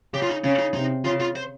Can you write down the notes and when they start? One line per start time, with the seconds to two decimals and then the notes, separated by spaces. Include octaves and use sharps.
0.13 C#3 G4
0.22 F4
0.29 D#4
0.44 C#3 C#4
0.59 D#4
0.74 C3 D#4
1.05 C#3 F4
1.20 F4
1.36 C5